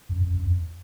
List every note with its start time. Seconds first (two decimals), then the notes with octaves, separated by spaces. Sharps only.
0.09 F#2
0.21 F#2
0.33 F#2
0.44 F2